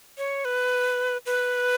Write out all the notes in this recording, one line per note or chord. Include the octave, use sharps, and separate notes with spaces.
C#5
B4
B4